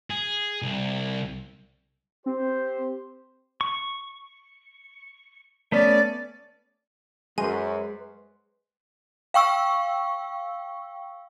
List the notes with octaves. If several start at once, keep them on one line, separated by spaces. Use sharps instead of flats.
G#4
C2
C4 G4 C5
C#6
A3 B3 C#4 D5
F#2 G#3 B4 C5 G#5 C6
F5 G5 C#6 E6